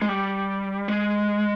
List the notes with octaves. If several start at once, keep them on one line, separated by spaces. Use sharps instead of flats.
G#3
G3
G#3